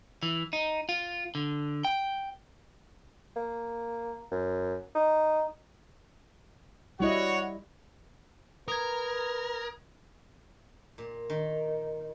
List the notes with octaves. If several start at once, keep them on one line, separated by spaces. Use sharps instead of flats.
E3
D#4
F4
D3
G5
A#3
F#2
D#4
G3 E4 F#4 C#5 D#5 F#5
A#4 B4 D#6 G#6
A#2
D#3